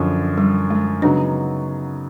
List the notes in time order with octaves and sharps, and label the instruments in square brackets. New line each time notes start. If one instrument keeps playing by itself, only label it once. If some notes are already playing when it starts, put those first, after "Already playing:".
Already playing: [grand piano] F#2 D3 F3
[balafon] G3
G#3
[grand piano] C#3 F#3 B3 D#4 [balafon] D4